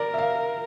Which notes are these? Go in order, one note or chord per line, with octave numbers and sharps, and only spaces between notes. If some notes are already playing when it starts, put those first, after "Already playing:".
Already playing: A#4 D5
E5
F5